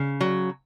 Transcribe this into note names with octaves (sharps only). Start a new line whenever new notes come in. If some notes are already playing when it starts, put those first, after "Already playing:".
Already playing: C#3
F#3